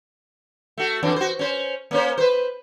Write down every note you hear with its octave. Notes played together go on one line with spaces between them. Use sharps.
A3 F#4
F2 E3 D4
F#4 C5
C#4 C5
A#3 C#4 C5
B4 C5